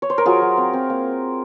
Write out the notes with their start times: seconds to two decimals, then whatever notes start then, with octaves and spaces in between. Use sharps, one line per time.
0.02 C#5
0.10 C5
0.18 A#4
0.25 F#3 F4 G#4
0.42 F#3
0.57 C4
0.73 C4
0.90 A#3